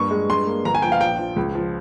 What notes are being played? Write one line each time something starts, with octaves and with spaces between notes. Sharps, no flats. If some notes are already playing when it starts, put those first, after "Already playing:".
Already playing: G2 A#3 C#6
G#3
G2 C6
A#3
G1 A#5
G#5
F3 G5
F5
A#1 G5
F3
C#2
F3